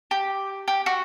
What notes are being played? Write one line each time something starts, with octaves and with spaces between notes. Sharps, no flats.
G4
G4
F#4